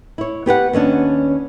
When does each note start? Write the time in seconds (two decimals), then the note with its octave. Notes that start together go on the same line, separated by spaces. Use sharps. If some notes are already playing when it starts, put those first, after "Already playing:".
0.18 E4 C#5
0.46 B3 G4 B4 F#5
0.73 D#2 B3 C#4 D4